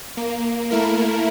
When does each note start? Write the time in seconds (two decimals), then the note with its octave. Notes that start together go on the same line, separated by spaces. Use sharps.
0.17 A#3
0.71 A3 A#3 E4 A#4